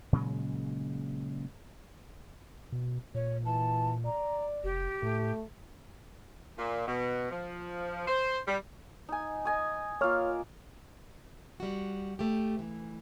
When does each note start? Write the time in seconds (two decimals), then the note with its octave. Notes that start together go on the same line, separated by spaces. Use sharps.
0.13 A#2 C#3 F#3 G#3
2.72 B2
3.15 A#2 C#5
3.45 E3 A5
4.05 D5 A#5
4.64 F1 G4
5.03 A2 A3
6.59 A#2
6.87 B2
7.31 F3
8.08 C5
8.48 G3
9.09 D#4 G#5
9.45 D#5 G#5 D#6
10.01 A#3 F4 C#5 F6
11.60 G3 F#4
12.19 A3 G4
12.59 E3